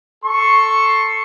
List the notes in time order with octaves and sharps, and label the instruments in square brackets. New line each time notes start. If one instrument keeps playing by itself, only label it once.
[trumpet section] A4 C6 C#6